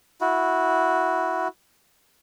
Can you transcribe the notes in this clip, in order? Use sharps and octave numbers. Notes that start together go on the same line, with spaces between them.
E4 F#4